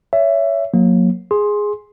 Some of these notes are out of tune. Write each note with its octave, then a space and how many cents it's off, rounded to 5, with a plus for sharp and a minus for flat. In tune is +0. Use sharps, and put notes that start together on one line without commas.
C#5 +20 E5 +15
F#3 -25 A#3 +0
G#4 +0 C6 +10